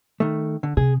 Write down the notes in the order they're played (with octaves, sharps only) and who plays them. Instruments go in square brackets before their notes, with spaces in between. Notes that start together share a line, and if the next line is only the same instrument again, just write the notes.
[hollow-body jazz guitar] D#3 A3
D3
[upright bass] C3 [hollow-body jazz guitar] G#4